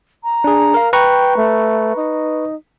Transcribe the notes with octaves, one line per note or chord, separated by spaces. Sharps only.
A#5
D4 G#4
A#4 F5
B4 G5 A#5 C#6
A3
D#4